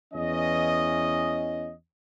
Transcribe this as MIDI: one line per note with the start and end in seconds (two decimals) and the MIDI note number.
0.13 1.72 40
0.13 1.72 52
0.13 1.72 61
0.13 1.72 75